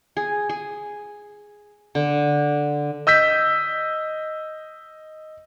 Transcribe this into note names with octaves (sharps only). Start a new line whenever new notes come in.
G#4
G#4
D3
D#5 E6 G6 B6